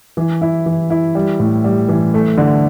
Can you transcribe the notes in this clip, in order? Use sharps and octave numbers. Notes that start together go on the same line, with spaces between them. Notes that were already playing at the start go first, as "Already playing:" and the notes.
E3
E4
E3
E4
G3
A2
G3
E3
A3
D3